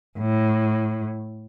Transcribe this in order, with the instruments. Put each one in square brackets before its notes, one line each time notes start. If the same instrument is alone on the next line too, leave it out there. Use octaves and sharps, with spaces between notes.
[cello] A2